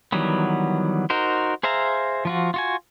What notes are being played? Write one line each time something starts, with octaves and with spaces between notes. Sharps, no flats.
D#3 E3 F#3 G3 B3
D#4 F#4 A#4 C5
G#4 C5 E5 F5 A#5
F3 F4 F#4
F4 F#4 G#5